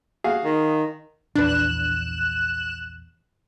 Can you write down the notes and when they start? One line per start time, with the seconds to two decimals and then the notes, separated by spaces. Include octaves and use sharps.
0.24 F#4 G#4 F5
0.45 D#3
1.36 A#1 E2 D4 B4 F#6 E7